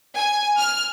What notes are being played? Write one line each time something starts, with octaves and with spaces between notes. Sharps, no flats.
G#5
F6